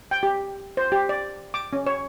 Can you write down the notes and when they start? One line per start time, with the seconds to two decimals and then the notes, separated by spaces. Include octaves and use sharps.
0.11 G5
0.23 G4
0.77 C5
0.92 G4
1.09 D5
1.54 D6
1.73 C#4
1.86 C#5